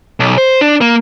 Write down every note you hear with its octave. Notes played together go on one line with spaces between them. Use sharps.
B1
C5
D4
A#3